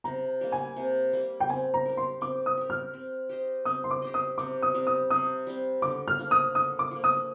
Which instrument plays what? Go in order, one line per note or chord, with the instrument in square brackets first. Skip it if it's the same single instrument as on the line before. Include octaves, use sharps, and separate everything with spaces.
[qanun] C3 [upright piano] A#5
[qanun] G3 A#3
[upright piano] G#5
[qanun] C3
G3 A#3
[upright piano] G5
[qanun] C4 [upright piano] G#5
[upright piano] A#5
[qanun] G4 A#4
[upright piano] C6
[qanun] C4 [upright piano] D6
[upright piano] D#6
[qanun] G4 A#4
[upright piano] F6
[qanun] C4
G4 C5 D#5
[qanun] C4 [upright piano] D#6
[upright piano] C6
D6
[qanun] G4 C5 D#5
[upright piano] D#6
[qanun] C3 [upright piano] D6
[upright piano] D#6
[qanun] G3 C4
[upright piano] D#6
[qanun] C3 [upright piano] D#6
[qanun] G3 C4
[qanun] D3 [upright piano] D6
[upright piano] F6
[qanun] F3 A#3
[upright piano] D#6
[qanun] D3 [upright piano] D#6
[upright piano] D6
[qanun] F3 A#3
[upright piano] D#6